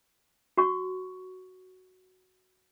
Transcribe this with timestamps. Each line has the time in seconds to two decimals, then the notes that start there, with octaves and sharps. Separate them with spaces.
0.57 F#4 C#6